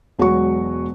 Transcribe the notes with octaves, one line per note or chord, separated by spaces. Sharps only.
E1 F#3 G#3 F#4 C#6